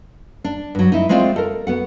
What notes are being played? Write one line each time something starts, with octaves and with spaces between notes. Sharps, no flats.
D4
G2 F#3
D#4 E4
G#3 A3 C4 F4 C5 D5
A4 A#4
B3 F#4 F#5